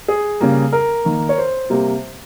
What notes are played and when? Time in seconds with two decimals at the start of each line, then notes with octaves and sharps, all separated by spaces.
0.08 G#4
0.41 C#3 G3 A#3
0.72 A#4
1.05 D#3 A#3
1.29 C#5
1.38 C5
1.70 C3 G3 A#3